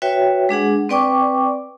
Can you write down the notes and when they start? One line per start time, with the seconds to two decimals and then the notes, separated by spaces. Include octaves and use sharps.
0.02 F#4 B4 C#5 E5 G5
0.49 G#3 D4 G#4 F#5
0.89 C4 B4 D5 G5 C#6 D6